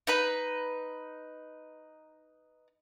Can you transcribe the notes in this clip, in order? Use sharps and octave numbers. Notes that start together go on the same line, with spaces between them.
D#4 B4 B5